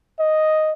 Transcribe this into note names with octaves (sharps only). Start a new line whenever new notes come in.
D#5